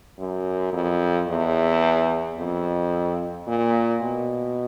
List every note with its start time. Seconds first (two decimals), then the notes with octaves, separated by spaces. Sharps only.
0.19 F#2
0.73 F2
1.28 E2
2.38 F2
3.47 A#2
4.02 B2